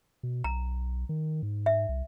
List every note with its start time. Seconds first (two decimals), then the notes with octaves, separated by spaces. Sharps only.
0.23 B2
0.44 B1 A#5
1.09 D#3
1.43 G#2
1.66 E5
1.89 C2